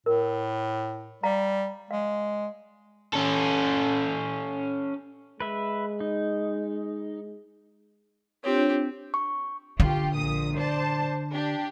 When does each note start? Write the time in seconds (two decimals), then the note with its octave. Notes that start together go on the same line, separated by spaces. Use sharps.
0.06 A2 A#4
1.23 G3 F5 A#5
1.91 G#3 F5
3.13 C#4 A4
5.40 G#3 B4 E5
6.00 D#4
8.44 C4 D4 F4 G4 C#5
9.14 C#6
9.80 D3 F4 G4
10.16 A#1 A#2 D#6
10.57 C5 D5 A5
11.34 D4 G4